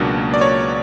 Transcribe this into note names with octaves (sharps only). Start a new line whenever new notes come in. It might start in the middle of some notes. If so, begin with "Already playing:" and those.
Already playing: C#2 B2 F#3 A#3 D4
D5
C#5